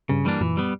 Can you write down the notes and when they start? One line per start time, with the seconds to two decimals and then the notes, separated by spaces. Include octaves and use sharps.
0.09 G2 C#3
0.25 E3 G3 A#3 D4
0.41 F#2 A#2 E3
0.57 G3 B3